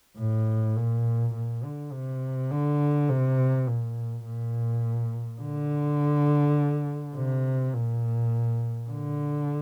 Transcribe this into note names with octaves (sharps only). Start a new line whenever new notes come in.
A2
A#2
A#2
D3
C3
D3
C3
A#2
A#2
D3
C3
A#2
D3